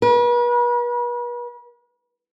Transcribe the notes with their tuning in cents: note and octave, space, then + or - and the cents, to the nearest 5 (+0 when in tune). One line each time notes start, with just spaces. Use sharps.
B4 -40